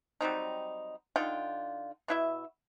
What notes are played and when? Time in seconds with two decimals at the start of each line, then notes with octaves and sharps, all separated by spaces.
0.21 F#3 G3 C4 D#4
1.16 D3 D#4 F4 G5
2.08 B2 E4 E5